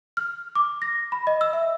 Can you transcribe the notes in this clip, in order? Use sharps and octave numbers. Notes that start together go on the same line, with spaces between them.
F6
D6
A#6
B5
D#5
E6
E5